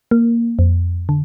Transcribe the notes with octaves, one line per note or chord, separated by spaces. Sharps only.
A#3
F2
D3